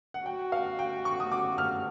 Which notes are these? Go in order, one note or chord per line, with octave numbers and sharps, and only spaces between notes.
F#5
F#4 G5
F5
G5
C#6
D#6
D6
F6